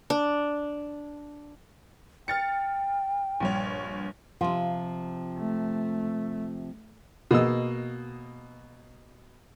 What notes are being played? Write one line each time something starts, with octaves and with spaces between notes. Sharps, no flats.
D4
G5 F6 A6 C#7
A#1 G2 C#5
C3 F3 F4
A3
B2 A#3 G#4 D#5 E6